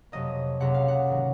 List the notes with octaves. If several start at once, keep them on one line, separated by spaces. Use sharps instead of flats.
F2 C3 F#3 A#3 D#5
C#2 C3 F#3 A#3 F#5
F5
F#5
G#2 D#3 F#3